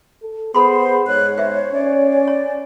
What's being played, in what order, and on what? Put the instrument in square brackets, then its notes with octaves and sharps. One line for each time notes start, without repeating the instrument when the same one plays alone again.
[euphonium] A4
[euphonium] B3 [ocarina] G#4 [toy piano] A4 B5 C6 [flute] C5
[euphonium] G#2 [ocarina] C#5 [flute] F#6
[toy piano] B4 E5 [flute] C5
[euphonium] C#4 [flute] D5
[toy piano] C#5